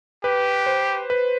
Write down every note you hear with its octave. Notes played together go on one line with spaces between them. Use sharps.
G4 B4
C5
B4